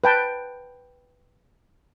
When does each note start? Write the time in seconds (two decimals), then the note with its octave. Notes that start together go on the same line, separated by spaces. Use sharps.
0.04 B4 G5 A5